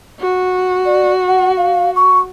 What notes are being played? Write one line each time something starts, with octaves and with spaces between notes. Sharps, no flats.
F#4
D5
F#5
F5
C#6